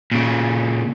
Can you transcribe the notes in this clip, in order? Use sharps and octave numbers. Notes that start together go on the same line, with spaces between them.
A#2 C#3